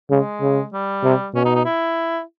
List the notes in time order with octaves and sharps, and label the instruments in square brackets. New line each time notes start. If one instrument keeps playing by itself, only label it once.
[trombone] C#3 [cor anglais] G#3
[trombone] C#3
[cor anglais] G3
[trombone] C3
[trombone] B2 [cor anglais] C#4
[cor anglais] D#4
D#4
E4